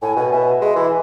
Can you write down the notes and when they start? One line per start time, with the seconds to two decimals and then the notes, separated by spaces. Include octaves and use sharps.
0.02 A2 G#5
0.17 B2 G#5
0.32 B2 E5
0.61 G#3
0.76 E3
0.83 E5